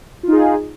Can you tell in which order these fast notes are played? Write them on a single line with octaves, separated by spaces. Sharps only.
F4 D#4 G#4